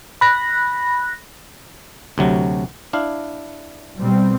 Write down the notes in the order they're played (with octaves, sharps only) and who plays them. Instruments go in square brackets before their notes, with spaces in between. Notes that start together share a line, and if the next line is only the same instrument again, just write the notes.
[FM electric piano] B5 F#6 A#6
[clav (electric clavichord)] D2 C3 F#3
D4 E4 F5
[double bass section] B2 G3 C4